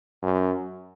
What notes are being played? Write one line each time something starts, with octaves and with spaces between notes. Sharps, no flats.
F#2